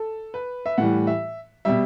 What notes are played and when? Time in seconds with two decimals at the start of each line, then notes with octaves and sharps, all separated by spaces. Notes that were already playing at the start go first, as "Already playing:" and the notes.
Already playing: A4
0.34 B4
0.66 E5
0.78 A2 E3 G3 F#5
1.07 E5
1.65 B2 G3 E5